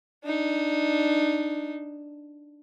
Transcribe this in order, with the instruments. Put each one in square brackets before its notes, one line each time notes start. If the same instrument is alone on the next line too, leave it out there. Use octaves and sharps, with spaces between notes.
[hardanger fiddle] D4 D#4